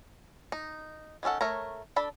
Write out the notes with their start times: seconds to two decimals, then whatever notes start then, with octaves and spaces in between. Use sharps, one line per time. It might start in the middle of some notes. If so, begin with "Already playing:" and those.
0.52 D#4
1.23 D#3 B3 C#4 A4 F#5
1.41 A3 A#4 C#5 A#5
1.96 D4 A4 B5